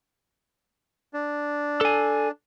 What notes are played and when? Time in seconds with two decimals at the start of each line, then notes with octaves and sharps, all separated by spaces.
1.14 D4
1.81 A4 G#5